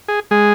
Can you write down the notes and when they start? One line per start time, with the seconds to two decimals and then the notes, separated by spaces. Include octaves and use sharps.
0.08 G#4
0.31 G#3 G#4